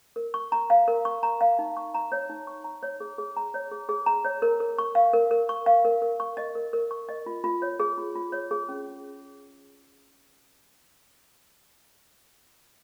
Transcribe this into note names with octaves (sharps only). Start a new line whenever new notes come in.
A#4
C#6
A#5
F5
A#4
C#6
A#5
F5
D#4
C#6
A#5
C#5
D#4
C#6
A#5
C#5
G#4
G#4
A#5
C#5
G#4
G#4
A#5
C#5
A#4
A#4
C#6
F5
A#4
A#4
C#6
F5
A#4
A#4
C#6
D#5
A#4
A#4
C#6
D#5
F4
F4
C#5
G#4
F4
F4
C#5
G#4
C#4